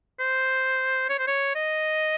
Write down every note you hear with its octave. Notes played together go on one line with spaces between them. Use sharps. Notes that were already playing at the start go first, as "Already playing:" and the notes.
C5
C#5
C5
C#5
D#5